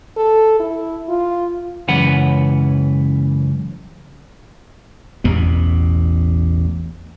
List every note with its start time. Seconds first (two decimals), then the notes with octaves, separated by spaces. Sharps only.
0.17 A4
0.60 E4
1.09 F4
1.88 C#2 F#2 E3 C#4 B4 F#5
5.24 A1 E2 B2 B3